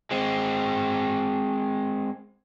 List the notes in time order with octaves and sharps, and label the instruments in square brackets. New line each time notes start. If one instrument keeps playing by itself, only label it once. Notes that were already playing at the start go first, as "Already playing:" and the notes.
[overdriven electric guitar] G#3 C4